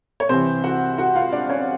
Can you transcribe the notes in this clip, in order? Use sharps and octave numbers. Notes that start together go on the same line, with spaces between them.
C#5
C2 C3 E3 C4 C5
F#4 F#5
F#4 F#5
F4 F5
D4 D5
C#4 C#5